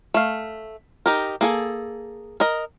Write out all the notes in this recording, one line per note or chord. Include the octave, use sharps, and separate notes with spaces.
A3 F5
D#4 G4 A#4
A#3 G#4 A4
A#4 D#5